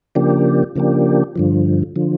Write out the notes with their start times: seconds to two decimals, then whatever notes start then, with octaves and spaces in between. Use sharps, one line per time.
0.15 C#3 F3 A#3 D4 G4
0.76 C#3 F3 A#3 D4 G4
1.36 G2 D3 F3
1.96 D3 F3